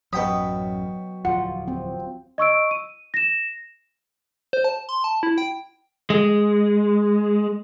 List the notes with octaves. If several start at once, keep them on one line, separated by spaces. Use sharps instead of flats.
A1 F#2 B2 F#3 G5 B5 D#6
D1 E2 F3 F4 F#5
C4
D#5 C#6 E6 D7
D#7
A#6 E7
C5
A5
C6
A5
E4
G5
G#3